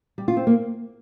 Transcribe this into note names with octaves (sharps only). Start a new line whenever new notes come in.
G3
F4
C4
A#3